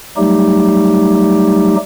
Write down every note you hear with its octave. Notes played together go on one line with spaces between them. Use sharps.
F#3 G3 A3 D#4 G4